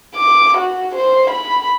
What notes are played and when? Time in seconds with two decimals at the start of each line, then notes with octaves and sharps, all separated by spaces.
0.16 D6
0.58 F#4
0.95 C5
1.30 B5